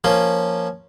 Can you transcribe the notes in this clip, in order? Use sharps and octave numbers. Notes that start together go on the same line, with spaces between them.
F3 A#3 C#4 F4